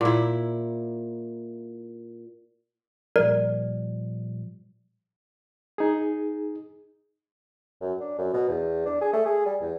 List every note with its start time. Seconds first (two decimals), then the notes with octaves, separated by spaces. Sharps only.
0.01 A#2 E4
3.16 A#2 F3 G3 A#4 D5
5.78 D#4 G#4
7.81 F#2
8.00 D4
8.18 F#2
8.33 B2
8.49 E2
8.85 D4
9.01 G#4
9.13 A3
9.26 G#4
9.46 G3
9.61 E2